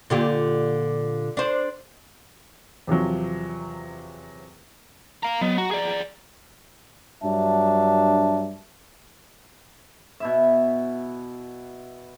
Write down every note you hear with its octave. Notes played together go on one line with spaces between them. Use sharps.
A#2 D3 G4
D4 C5
E2 C3 F3 F#3
F5 A#5
F#3 B3 D#5
F#4 A#5
G#4 D5
G2 F#3 D4 E5 A5
B2 E4 E5